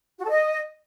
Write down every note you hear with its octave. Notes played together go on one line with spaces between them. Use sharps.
F#4
A4
D#5